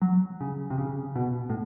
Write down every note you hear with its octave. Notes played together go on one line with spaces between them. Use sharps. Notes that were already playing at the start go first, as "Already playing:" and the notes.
F#3
C#3
C3
C#3
B2
A2